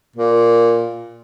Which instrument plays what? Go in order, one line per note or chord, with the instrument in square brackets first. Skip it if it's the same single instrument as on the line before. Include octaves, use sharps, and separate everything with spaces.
[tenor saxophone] A#2